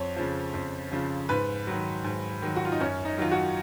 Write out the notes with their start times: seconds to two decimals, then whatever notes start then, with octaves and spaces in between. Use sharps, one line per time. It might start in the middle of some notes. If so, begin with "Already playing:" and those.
Already playing: F2 C#5
0.16 C#3 F3
0.54 F2
0.91 C#3 F3
1.29 G#2 B4
1.67 D#3 F#3
2.04 G#2
2.42 D#3 F#3
2.56 F#4
2.65 F4
2.72 D#4
2.80 F#2 C#4
3.05 D#4
3.18 D#3 F#3 F4
3.31 F#4